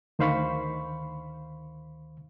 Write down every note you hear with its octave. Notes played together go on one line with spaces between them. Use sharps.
D2 D#3 C5 F5 B5 C#6